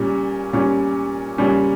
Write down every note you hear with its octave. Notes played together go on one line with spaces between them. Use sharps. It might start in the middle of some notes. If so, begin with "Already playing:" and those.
Already playing: A#2 G3 C#4
A#2 G3 C#4
A#2 G3 C#4